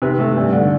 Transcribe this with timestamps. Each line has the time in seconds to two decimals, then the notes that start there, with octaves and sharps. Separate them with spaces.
0.02 C3 B4
0.19 A3 A4
0.37 G2
0.53 D3